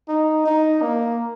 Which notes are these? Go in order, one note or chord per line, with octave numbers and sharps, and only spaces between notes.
D#4
D#4
A#3